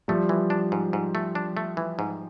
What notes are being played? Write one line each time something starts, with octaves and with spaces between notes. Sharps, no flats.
F3 G3 A3
E3
D4
G#2
G#2
A3
D4
A3
E3
G#2